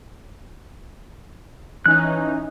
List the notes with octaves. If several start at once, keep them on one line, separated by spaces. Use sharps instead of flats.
E3 C#4 D#4 F#6